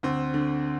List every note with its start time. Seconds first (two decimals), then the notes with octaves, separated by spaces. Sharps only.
0.03 D2 C4
0.34 D3